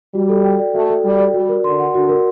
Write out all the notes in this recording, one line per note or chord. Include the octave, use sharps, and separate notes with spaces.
G3 F#4
A4
G5
D5
A3 F#4
A4
G3 G5
D5
G3 F#4
A#4
D3 C6
F#5
D3 F#4
A#4